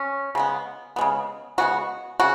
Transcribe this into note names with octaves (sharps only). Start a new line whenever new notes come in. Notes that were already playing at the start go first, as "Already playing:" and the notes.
Already playing: C#4
C#3 G#3 B3
C#3 G#3 B3
C#3 G#3 B3 F#4
C#3 F#4